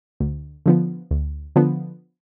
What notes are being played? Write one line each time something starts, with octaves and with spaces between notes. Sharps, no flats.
D2
D3 F3 B3
D2
D3 F3 B3